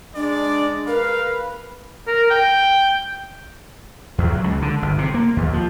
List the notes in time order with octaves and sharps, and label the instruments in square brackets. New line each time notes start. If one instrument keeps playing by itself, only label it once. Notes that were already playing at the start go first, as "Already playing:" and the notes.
[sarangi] G#3 [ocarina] D4 [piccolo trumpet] D5
[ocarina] A#4 [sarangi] B4 [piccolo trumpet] F5
[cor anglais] A#4
G5
[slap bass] E2
F#3
C#2
D3
G1
C3
A#3
D#2
F3